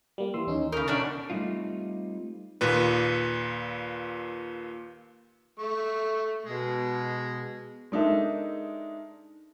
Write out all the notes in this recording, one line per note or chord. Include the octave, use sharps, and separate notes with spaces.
G3 A#3
E3 C6 E6
D#2 C#4 D#4
C#3 A#4 C#6 D#6 G6
B2 C#4 D4
G3 A3 C4 D#4 F4
D#2 A#2 B4
A3 C#6
B2 G#3
G#3 D4 D#4 A4 A#4 E5